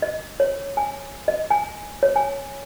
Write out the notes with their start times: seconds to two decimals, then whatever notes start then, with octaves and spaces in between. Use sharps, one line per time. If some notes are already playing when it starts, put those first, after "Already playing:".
0.02 D#5
0.40 C#5
0.77 G#5
1.28 D#5
1.50 G#5
2.03 C#5
2.16 G#5